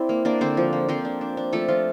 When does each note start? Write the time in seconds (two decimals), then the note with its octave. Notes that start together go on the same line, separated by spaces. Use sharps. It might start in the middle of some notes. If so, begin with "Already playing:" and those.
Already playing: C4 E4 D5 E5
0.09 A#3
0.25 A#3 D4 D5
0.41 D3 C4 C5
0.57 F3
0.73 A#3
0.89 F3 C4 C5
1.05 D4
1.21 D4
1.37 D4
1.53 F3 A3 A4
1.68 F3 F4